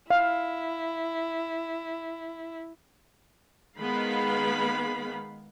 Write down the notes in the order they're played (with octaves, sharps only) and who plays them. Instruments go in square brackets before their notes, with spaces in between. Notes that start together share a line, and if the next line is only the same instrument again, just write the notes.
[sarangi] E4 [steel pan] F5
[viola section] D#3 G#3 B3 F5 B5